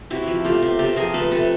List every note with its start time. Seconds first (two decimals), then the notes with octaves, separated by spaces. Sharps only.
0.10 C3 E4 F#4
0.27 F3
0.45 A3 F4 G4
0.62 C3
0.79 C3 G4 A4
0.96 F3 G#4 A#4
1.14 A3 A4 B4
1.31 C3 A4 B4